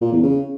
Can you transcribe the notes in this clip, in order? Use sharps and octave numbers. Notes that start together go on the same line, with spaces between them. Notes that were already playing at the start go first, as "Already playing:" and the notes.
A#2
E2
C#3